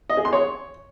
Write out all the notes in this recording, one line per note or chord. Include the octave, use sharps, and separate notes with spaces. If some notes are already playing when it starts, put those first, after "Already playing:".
D#5
G#4
C6
C#5